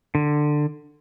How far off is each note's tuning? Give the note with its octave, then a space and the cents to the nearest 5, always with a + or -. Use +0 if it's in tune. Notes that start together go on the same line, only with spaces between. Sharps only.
D3 +15